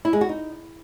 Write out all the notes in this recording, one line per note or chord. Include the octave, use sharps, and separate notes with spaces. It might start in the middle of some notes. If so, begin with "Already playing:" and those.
E4
G#3
F#4
D#4